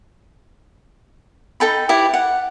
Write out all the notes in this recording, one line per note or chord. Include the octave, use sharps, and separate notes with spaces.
D#4 A4 G5 B5
E4 G4 B4
F#5